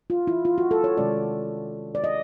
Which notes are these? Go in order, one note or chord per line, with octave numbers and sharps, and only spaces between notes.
F4
E4
F4
F#4
A4
C#5
C3 D#3 G#3 C#4 D5
D5
D#5